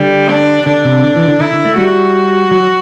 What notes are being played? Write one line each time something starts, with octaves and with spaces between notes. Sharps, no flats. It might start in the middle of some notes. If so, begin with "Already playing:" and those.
Already playing: D3 G3
D4
D3 D4
C3
D3
E3
D3
D3 E4
D3
A3
G3 F#4
F#3